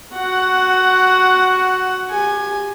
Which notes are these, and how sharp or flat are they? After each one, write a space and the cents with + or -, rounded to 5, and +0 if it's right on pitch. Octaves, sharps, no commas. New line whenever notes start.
F#4 +0 F#5 +15
G4 +35 G#5 +0